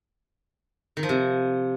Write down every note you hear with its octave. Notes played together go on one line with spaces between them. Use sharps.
D#3
F3
C3